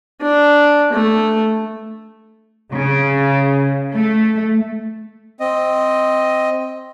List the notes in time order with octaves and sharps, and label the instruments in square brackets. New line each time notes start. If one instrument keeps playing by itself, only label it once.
[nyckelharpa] D4
A3
[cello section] C#3
A3
[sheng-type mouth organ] C4 D#5